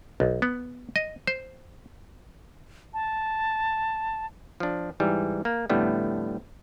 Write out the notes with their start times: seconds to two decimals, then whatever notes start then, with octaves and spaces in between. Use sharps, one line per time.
0.20 B1
0.42 B3
0.96 D#5
1.27 C5
2.94 A5
4.60 F3 D4
5.00 G#2 E3 G3
5.45 A#3
5.70 F2 A2 D3 G3 A3 B3